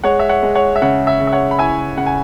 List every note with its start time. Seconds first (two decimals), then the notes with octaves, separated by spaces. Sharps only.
0.04 G#3 C#5 F#5
0.19 E5
0.29 C#5 F#5
0.43 G#3
0.55 C#5 F#5
0.76 E5
0.82 C#3 C#5 F#5
1.07 E5
1.20 C#3
1.27 E5
1.33 C#5 F#5
1.51 B5
1.59 E4 E5 G#5
1.97 C#3 F#5
2.06 G#5